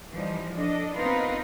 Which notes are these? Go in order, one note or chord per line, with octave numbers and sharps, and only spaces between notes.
E3 F3 G3 D#4
D4 A4 D#5
B3 C4 D#4 F4 A#4 B4